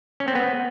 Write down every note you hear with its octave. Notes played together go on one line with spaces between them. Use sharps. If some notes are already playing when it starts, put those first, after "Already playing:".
C#4
C4
B3